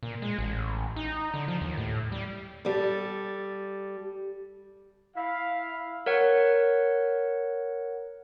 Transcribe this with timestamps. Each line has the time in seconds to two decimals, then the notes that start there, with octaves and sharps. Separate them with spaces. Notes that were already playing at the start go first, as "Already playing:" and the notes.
0.03 A#2
0.22 G#3
0.38 A1
0.96 D#4
1.34 D3
1.48 F3
1.61 D#2
1.77 A2
2.12 G3
2.65 G3 A4
5.16 E4 F5
6.06 A#4 C#5 F#5